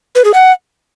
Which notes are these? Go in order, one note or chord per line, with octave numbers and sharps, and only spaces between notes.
B4
G#4
F#5